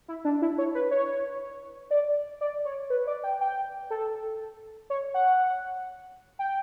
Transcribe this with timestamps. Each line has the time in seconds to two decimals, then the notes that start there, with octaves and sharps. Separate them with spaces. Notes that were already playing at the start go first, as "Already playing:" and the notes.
0.08 E4
0.25 D4
0.42 E4
0.58 C#5
0.75 B4
0.91 C#5
1.91 D5
2.41 D5
2.65 C#5
2.90 B4
3.07 D5
3.24 G5
3.41 G5
3.90 A4
4.90 C#5
5.14 F#5
6.39 G5